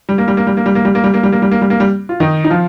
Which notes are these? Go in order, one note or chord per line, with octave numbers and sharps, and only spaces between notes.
G3
A#3
G3
A#3
G3
A#3
G3
A#3
G3
A#3
G3
A#3
G3
A#3
G3
A#3
G3
A#3
G3
F4
D#3 D#4
D#4
F3 F4